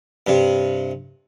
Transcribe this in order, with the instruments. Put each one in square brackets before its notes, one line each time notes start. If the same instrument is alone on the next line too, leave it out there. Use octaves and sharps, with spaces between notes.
[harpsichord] G2 C3